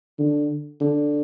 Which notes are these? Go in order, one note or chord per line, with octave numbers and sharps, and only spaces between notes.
D3
D3